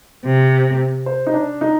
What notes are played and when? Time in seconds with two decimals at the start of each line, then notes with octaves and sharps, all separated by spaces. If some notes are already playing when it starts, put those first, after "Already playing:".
0.25 C3
1.06 C5
1.27 D#4
1.34 D4
1.61 D#4